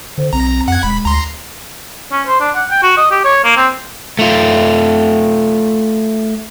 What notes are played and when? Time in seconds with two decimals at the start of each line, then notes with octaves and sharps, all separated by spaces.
0.18 D3 C5
0.33 B1 C4 A#5
0.68 F2 F#5 G#6
0.83 D#1 G#3 B5
1.05 D2 A#5 C6
2.12 C#4
2.27 C5
2.40 D4
2.55 F#5
2.71 G5
2.83 F#4
2.97 D#5
3.11 G4
3.25 C#5
3.44 A#3
3.57 C4
4.19 A3 F4